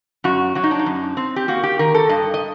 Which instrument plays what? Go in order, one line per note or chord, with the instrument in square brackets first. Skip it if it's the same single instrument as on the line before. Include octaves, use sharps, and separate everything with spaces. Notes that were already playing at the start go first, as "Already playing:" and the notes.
[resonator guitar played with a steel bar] F#2 F#4
F#3 F#4
D#4
D4
D#4
F#2
C4
G4
A#3 F#4
G4
D#3 A#4
A4
G2 D#5
D#5